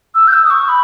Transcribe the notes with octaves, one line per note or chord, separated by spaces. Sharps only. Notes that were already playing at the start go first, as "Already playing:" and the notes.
E6
G6
E6
D#6
C#6
B5